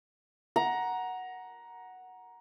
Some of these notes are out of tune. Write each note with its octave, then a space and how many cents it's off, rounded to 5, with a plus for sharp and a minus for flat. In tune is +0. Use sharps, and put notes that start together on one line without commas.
F#5 +0 A#5 +15